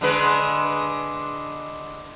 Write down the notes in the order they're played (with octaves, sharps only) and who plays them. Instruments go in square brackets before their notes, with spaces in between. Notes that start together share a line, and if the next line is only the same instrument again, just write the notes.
[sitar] D3 G#3 B4